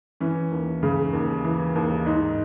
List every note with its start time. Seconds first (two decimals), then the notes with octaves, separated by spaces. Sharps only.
0.20 E3 C#4
0.52 D#2
0.83 C#3
1.13 D#2
1.44 E3
1.75 D#2
2.06 G#2 D#4